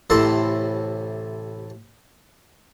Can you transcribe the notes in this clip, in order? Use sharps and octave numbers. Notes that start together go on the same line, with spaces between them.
A1 A2 C3 A4 A5 C6